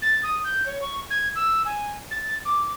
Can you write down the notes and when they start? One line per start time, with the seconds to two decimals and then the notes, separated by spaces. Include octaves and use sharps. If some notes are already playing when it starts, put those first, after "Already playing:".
0.02 A6
0.23 D#6
0.44 G6
0.66 C#5
0.82 C#6
1.10 G#6
1.35 E6
1.65 G#5
2.11 A6
2.45 D6